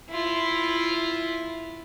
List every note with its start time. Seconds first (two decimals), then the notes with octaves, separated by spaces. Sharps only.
0.10 E4 F4